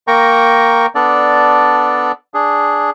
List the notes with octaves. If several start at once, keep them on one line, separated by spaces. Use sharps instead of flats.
A#3 A#4 G5 A#5 C#6
B3 D4 A4 D5
D4 G#4